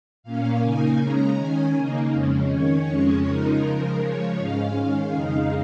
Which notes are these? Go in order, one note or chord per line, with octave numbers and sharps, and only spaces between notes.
A#2 A#3 C#4 F5
C#3 A#3 D#4 G#5
C#3 G#3 C#4 A#5
D#3 C#4 G#5
C#3 A#3 D#4
F2 C#3 G#3 C#4
D#3 C#4 C#5
F2 C#3 G#3 C#4
C#3 F3 G#3 D#4 A#4
C#3 F3 G#3
C#3 F3 G#3 C#5
G#2 G#3 C#4 F5
D#3 G#3 C#4
F2 C#3 G#3 D#4 F5